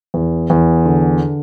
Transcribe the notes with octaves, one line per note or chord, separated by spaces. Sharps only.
E2
E2
D3